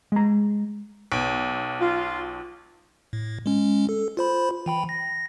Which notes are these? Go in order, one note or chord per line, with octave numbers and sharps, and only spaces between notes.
G#3 A#5
B1
F4
A2
G#3 C#4
A4
F4 C5 B5
E3 G5 B5
A#6